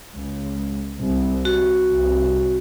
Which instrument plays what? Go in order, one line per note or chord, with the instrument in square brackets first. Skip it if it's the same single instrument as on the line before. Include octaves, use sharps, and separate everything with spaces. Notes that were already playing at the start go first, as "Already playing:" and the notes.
[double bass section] C#2
C2
[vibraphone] F#4
[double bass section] C2